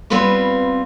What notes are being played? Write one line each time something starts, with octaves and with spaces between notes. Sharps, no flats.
G3 B3 C4 F4 B4 C#5